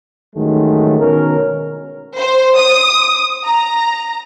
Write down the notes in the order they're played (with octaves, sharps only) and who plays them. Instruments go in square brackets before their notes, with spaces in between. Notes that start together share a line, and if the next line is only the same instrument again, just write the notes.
[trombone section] A1 D#3 F#3 G#3 A3
B2 D#3 C#4 A#4
[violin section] C5
D#6
A#5